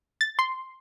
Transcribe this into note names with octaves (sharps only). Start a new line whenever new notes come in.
A6
C6